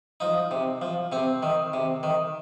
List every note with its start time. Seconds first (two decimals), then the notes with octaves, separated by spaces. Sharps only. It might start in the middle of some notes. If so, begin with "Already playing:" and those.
0.20 F3 D#4
0.51 C3
0.82 F3
1.12 C3 C4
1.43 D#3
1.73 C3
2.03 D#3